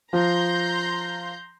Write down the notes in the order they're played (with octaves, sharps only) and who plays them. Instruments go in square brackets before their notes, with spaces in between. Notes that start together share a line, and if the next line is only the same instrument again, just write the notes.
[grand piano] F3 [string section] A#5 C6 G6